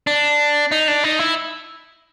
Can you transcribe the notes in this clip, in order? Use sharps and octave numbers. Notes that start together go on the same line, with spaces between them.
D4
D#4
D4
D#4
E4